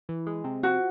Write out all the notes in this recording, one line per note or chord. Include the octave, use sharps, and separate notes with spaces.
E3
G#3
C3
F3 F#4